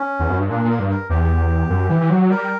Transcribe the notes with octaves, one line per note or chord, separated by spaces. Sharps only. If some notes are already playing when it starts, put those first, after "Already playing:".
Already playing: C#4
E2
F#2
G2
A#2 D4
A#2
A#4
G2
A#4
E2 G4
F#2
E3
E3
F#3
G3 A#4